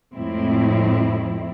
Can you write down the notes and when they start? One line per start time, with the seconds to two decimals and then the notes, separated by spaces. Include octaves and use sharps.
0.14 F2 A2 G#3 C4 E4